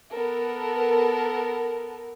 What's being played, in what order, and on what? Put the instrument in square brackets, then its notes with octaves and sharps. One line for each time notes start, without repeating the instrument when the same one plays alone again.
[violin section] B3 A4 A#4